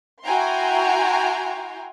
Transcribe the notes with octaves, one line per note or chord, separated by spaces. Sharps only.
E4 F#4 G5 G#5 A#5 C6